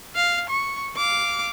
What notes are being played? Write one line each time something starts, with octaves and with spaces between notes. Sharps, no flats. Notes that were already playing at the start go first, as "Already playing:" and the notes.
F5
C#6
F5 D6